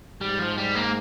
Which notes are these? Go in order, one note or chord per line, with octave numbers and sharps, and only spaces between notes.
G#2 G3
F3
G3
A#3